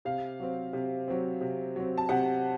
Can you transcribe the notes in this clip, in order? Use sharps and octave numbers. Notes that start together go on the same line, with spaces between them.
C3 F5
F#3 C4
C3
F#3 C4
C3
F#3 C4
A5
C3 F#5